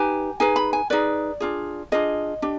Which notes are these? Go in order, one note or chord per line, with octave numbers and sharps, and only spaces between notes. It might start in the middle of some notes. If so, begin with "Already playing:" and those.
Already playing: D#4 G4 B4 G#5
D#4 G#4 B4 G#5
B5
G#5
D#4 G#4 B4 D5
D4 F4 G#4
D4 F4 G#4 D#5
D4 G4